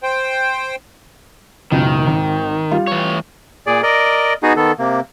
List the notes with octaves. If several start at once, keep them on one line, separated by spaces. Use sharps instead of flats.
C5 G5
F#1 C#2 B2 D#3
G#1
G3 F4
E3 C#5
A#2 G#4 D5
A#4 D5 D#5
B3 D#4 F#4 G#4
D#3 B3 A4
C3 A#3